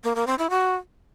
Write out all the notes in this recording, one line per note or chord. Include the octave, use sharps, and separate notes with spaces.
A#3
A#3
C4
E4
F#4